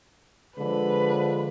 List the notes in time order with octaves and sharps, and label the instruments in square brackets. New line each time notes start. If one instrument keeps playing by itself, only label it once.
[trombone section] D3 F3 G#3 [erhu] B4